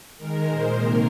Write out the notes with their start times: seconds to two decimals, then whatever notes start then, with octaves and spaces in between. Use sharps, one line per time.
0.17 D#3 G#3 A#4
0.46 A#2 G#3 C5
0.74 C3 D#3 A#3 A#4